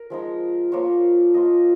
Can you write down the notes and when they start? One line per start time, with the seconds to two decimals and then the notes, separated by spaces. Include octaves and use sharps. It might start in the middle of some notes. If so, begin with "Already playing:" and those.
Already playing: A#4
0.10 F3 G#3 D#4
0.72 F3 A#3 F4 C#5
1.34 F3 A#3 F4 D#5